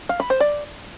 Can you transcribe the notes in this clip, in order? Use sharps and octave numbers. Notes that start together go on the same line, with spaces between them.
F5
B5
C5
D5